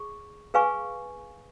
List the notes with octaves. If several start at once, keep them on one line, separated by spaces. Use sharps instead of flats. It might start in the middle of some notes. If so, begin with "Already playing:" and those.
Already playing: G#4 C#6
G#4 B4 F5 G#5 C#6